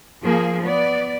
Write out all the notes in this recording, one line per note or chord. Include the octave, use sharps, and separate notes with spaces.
F3 A#3 G#4
B3 D5